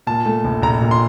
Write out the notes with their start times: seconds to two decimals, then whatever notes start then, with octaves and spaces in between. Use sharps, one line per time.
0.07 A#2 A5
0.26 A3
0.45 A#1
0.62 A#1 A#5
0.81 A#2
0.91 C6